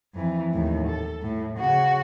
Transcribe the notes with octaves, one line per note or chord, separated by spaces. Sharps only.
F2 E3
D#2 A2
A4
A2
C#3 F#4